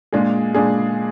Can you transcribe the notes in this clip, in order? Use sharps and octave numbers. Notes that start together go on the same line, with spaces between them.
A#2 G#3 D4 G#4
A#2 G#3 D4 G#4